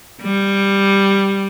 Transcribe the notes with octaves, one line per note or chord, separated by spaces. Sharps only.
G3